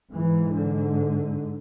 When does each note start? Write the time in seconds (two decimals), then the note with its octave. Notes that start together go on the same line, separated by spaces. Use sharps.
0.12 G#2 E3
0.52 D3